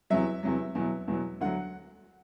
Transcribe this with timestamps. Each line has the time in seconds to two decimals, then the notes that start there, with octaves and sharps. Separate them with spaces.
0.10 E2 C3 F#3 E5
0.43 E2 C3 F#3
0.75 E2 B2 F#3
1.08 E2 B2 F#3
1.41 D2 D3 F#3 F#5